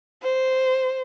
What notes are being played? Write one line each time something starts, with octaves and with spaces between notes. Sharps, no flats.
C5